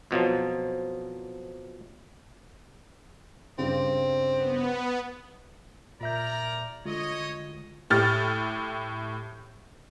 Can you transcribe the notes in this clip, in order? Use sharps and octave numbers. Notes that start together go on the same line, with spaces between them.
F2 B2 F3 F#3
G2 C#3 G3 C4
B3
A#2 A#4 D5 E5 A#5 G6
D3 G#3 F4 C#5 D#5
A2 G4 F6 A6